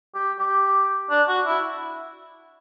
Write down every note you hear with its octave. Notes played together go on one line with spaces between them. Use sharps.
G4
G4
D4
F#4
E4